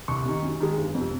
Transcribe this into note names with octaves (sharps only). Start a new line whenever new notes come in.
C2 C#6
C3 D#3
F#2
D#3 G#3
G1
F2 C3